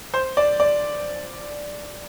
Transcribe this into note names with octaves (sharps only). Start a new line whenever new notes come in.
C5
D5
D5